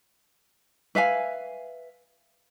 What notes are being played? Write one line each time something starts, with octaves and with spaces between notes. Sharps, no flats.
B4 E5 F5 G#5